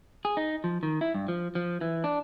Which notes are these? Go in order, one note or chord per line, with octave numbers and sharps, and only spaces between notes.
G#4
D#4
F3
D#3
E4
G2
F3
F3
E3
D4